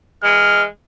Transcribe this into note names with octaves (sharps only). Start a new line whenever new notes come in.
E3 G#3 F6